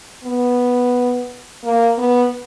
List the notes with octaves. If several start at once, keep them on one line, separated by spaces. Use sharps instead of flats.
B3
A#3
B3